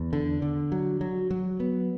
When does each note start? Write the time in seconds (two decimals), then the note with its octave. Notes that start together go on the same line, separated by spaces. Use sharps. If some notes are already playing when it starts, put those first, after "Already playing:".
Already playing: E2
0.13 D3
0.42 D3
0.72 F#3
1.01 F#3
1.31 F#3
1.60 B3